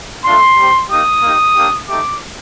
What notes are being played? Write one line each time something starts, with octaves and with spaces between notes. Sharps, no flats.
A3 D4 F4 C6
G3 C4 G4
A#3 D#4 G4 D#6
A#3 D#4 G4
A#3 D4 G4
A3 D#4 G4 D6